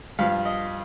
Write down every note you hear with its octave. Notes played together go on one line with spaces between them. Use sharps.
G2 F3 F5
D#5